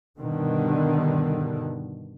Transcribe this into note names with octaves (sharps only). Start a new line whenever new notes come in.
G2 B2 D3 D#3